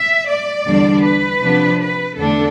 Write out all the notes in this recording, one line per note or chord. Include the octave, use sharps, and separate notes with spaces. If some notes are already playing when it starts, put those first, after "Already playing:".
Already playing: E5
D5
E2 D3 G3 D4
B4
C3 F3 B3 D4
B4
E2 D3 A3 D4 A4